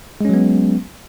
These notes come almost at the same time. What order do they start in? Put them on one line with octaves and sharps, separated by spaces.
G#3 C#4 F#3 B3